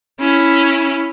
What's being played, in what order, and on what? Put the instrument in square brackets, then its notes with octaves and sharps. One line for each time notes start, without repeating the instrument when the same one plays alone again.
[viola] C#4 E4